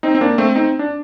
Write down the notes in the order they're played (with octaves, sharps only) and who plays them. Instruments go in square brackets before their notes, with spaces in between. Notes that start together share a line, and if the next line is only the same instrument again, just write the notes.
[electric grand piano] C4 D#4
C4
A#3 D4
A3 C4
C4 D#4
D4